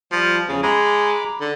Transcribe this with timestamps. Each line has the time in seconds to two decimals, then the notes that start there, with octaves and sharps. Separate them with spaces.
0.12 F3 G3
0.49 E2 C#3 F3 D#6
0.63 G#3 A#5 B5 D6
1.40 D3